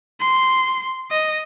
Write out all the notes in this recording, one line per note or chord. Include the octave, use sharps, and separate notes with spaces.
C6
D#5